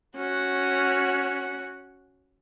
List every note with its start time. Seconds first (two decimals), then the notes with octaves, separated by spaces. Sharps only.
0.16 C#4 F#4 F#5